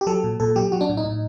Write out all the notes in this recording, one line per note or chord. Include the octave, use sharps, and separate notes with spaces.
G4
F#3 A4
A#2
A#2 A4
F#3 G4
F#3 F#4
D4
A2
D#4
A2